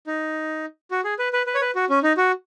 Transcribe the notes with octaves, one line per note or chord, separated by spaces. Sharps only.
D#4
F#4
G#4
B4
B4
B4
C#5
B4
F#4
C#4
D#4
F#4